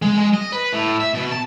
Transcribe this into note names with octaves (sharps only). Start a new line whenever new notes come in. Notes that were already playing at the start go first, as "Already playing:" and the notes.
G#3
G#3
D#5
B4
A2
E5
B2
A5